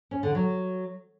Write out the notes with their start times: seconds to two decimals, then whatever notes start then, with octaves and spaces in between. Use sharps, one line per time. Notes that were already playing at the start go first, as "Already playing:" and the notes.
0.11 C#4
0.23 D3
0.35 F#3